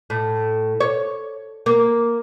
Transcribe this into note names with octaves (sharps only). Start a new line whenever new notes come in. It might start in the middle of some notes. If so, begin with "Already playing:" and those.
A2
C#5
A#3